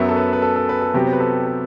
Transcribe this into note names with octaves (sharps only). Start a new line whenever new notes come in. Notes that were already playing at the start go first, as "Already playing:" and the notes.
Already playing: F#2 F#3 B3 E5
A4
B4
B4
A4
A4
B4
A4
C3 F#3 B3 G4
C5
B4
A4
A4